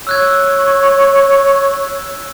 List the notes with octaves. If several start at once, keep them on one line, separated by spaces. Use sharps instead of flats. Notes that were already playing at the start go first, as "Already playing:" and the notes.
C#5 E6 F#6 G#6